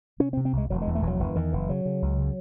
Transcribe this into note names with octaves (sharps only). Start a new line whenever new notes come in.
C3 C#4
C4
C3
C4
C2 G#3
E1 F#3
G#3
E2
A3
E1 E3 F#3
F#1 E3
E2 D#3
F#1 E3
C#3 F#3
C#3
C#2
C#3